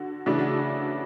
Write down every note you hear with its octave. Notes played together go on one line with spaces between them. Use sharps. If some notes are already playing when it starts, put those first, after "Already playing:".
Already playing: D3 F#4
C#3 E3 A3 D4 F#4